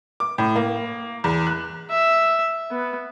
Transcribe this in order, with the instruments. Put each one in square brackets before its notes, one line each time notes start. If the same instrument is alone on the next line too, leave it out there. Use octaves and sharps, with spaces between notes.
[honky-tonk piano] D6
A2
A#3
E2
F#6
[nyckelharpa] E5
B3